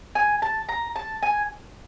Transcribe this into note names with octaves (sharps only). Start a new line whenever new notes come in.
G#5
A5
A#5
A5
G#5